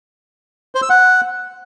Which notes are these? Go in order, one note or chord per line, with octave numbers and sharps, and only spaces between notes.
C5
E6
F#5